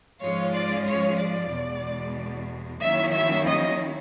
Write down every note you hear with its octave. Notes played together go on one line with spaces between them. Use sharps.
G#2 F3 G#3 C#4 F4 C#5
D5
C#5
D5
E2 B2 G#3
D#3 F#3 A#3 C#4 E4 E5
E5
D#5